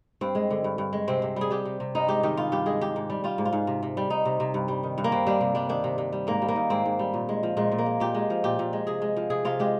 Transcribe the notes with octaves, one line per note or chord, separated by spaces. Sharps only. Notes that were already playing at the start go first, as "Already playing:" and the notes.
G2 C4
G#3
D3
G2
G2
G#3
C3 C4
C3
G3 G#4
G3 G4
C3
C3
G2 D#4
G#3 G4
D#3 G4
G2 F4
G2 G4
G#3 G#4
G#2 G4
G#2
G3
G3 F4
G#2
F4
G#2
C3
C3
G3
G3 D#4
C3
C3
G2
G3
D#3
G2
A#3
G2 C4
G3 D4
C3
G3 D4
D#3 D4
C3
C3
G3
G#2 A#3
G3
A#3
D#3
G#2 C4
G#2
G3
A#2
G#3
F3
A#2 G#3
A#2
A#3
G#3
A#2 G4
G#3
F3
A#2 G4
A#2
G#3
C3 G#4
G#3
F3
C3 G#4
C3 F4
G#3 G4